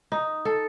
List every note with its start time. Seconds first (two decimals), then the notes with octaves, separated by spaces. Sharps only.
0.12 D#4
0.45 A4